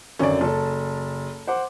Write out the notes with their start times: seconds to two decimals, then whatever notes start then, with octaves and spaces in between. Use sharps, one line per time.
0.19 G#1 F#2 D3 C#4 D5
0.41 F#1 A4 A5
1.47 C5 F#5 D6